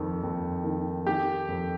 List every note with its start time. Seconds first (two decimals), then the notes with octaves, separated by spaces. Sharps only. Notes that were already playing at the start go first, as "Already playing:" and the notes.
Already playing: F2 D#3
0.23 F2
0.64 D#3
1.06 D#3 G4
1.48 F2